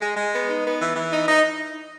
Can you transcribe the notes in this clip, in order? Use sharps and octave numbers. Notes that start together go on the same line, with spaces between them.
G#3
G#3
B3
D#4
B3
E3
E3
D#4
D#4